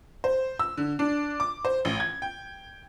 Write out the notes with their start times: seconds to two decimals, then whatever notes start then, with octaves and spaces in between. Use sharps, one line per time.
0.24 C5
0.59 E6
0.78 D3
0.99 D4
1.40 D6
1.65 C5
1.85 A1
2.00 G#6
2.22 G5